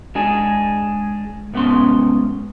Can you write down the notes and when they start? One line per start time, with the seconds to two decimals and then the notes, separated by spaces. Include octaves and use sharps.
0.15 G#3 D4 G#4
1.54 C2 G#2 B3 C#4 C6